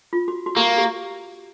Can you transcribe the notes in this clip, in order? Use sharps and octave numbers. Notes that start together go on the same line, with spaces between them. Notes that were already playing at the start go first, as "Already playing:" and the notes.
F4
F#4
F#4
A#3 G4
G4